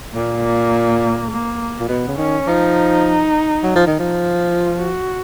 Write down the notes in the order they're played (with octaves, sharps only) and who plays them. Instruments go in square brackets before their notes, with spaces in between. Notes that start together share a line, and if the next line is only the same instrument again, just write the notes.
[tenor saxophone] A#2 [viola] A#3
[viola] A#3
A#3
[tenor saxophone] A#2
[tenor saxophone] B2 [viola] B3
[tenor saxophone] C#3
[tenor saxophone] D#3 [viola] C#4
[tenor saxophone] F3 [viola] D#4
[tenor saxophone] F#3
F3
D#3
F3
[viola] F4
F#4